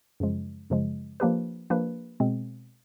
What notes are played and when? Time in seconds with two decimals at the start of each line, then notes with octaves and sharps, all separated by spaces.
0.20 F#2 C#3 F3 G#3
0.70 F#2 C#3 F3 G#3
1.20 F3 A#3 D4 G4 B4
1.70 F3 A#3 D4 G4 B4
2.20 B2 G#3 C4